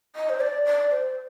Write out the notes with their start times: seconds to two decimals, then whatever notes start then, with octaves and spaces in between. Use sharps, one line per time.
0.16 D#5
0.29 C5
0.41 D5
0.65 D5
0.91 C5